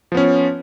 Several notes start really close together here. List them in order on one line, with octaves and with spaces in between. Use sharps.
F3 B3 C#4